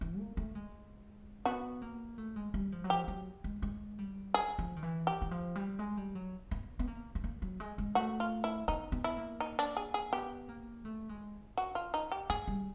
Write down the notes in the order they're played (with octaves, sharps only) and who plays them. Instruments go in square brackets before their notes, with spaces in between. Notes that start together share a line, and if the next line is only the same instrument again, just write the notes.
[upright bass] E3
A#3
A3
G#3
[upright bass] B3 [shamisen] F#4
[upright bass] A#3
A3
G#3
G3
F3
F#3
[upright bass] F3 [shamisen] G4
[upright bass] F#3
G#3
G#3
G3
[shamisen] G#4
[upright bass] F3
D#3
E3
[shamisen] G4
[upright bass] E3
F3
G3
G#3
G3
F#3
B3
B3
A#3
B3
A#3
F#3
G#3
G#3
[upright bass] A3 [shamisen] F#4
[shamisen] F4
E4
[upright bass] B3 [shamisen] D#4
[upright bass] B3
[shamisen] E4
[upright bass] A#3
[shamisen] D#4
D4
G#4
G#4
[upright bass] B3 [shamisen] G4
[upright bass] A#3
A3
G#3
[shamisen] F#4
F4
D#4
G4
[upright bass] A#3 [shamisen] G#4
[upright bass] G3